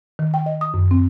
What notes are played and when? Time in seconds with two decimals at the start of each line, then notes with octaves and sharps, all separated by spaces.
0.19 D#3
0.34 G5
0.46 D#5
0.61 D#6
0.74 F#2
0.91 C4